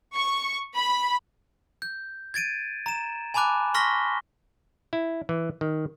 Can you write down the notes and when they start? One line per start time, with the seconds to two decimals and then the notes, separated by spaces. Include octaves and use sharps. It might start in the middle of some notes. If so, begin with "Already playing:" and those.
0.16 C#6
0.76 B5
1.82 G6
2.34 G#6 A6 D7 D#7
2.86 A#5 E7
3.34 G#5 A5 B5 D6 F#6
3.74 C6 C#6 F6 A#6 B6 G7
4.93 E4
5.29 E3
5.61 D#3